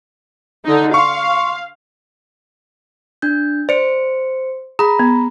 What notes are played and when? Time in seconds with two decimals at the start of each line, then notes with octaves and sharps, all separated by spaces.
0.65 D3 D#4
0.94 F5 C6 C#6
3.22 D4 G6
3.69 C5 D5 C#7
4.79 G#4 A#5 B5
4.99 B3